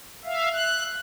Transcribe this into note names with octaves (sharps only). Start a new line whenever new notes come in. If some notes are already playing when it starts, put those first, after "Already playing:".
E5 F5
F#6